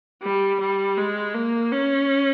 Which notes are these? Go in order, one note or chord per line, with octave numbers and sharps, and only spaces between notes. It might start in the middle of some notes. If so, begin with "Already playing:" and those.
G3
G3
G#3
A#3
C#4